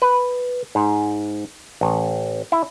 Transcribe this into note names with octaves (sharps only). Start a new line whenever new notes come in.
B4
G#2
A1
E4